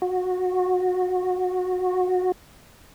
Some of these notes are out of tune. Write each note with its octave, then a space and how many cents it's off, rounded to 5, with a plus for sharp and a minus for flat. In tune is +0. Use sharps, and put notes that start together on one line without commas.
F#4 -20